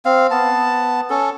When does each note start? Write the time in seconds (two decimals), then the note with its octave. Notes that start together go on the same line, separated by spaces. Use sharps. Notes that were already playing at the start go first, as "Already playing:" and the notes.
0.05 C4 F5
0.31 B3 A5
1.10 C#4 A4